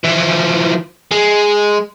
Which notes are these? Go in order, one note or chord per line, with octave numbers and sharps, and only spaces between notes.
E3 F3
G#3